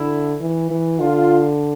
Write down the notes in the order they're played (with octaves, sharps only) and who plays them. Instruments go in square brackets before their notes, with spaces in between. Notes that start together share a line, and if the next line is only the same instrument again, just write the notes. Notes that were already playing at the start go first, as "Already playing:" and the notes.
Already playing: [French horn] D3 [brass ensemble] E4
[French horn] E3
E3
[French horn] D3 [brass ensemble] F4